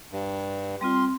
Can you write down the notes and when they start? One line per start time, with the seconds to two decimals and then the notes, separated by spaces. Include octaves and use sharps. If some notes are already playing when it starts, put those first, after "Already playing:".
0.12 G2
0.81 G3 C4 F4 C6